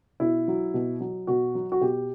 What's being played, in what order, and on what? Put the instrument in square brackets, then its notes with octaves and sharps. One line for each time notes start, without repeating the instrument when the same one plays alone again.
[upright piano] B2 E4
F#3
B2
F#3
B2 F#4
F#3
F#4
B2 G4